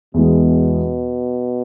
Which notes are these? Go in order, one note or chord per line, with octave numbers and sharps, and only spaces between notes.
E2 B2 E3 G#3